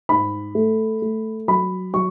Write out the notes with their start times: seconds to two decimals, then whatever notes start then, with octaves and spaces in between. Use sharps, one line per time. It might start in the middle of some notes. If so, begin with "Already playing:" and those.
0.09 G#2 B5
0.55 A3
1.02 A3
1.48 F#3 B5
1.93 F#3 C#6